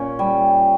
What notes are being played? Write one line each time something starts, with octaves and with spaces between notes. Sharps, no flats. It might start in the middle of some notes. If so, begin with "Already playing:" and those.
Already playing: A#2 C#4
G3